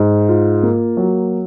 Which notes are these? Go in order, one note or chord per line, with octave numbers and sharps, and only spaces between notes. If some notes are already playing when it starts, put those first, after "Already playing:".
Already playing: G#2
F4
A#3
F#3